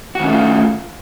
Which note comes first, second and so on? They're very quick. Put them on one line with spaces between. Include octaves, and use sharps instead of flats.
F#4 D#3 C#4 A3 F4